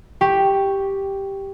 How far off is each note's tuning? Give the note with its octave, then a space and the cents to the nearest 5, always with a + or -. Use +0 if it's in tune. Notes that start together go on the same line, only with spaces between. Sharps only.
G4 +0 C#6 +0